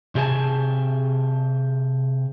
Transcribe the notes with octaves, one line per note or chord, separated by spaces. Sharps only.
C3 G4 G#4 A#4 G#5 A5